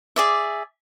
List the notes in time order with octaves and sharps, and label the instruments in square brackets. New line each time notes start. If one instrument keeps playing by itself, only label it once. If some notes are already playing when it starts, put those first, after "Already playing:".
[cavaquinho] G#4 D5 E5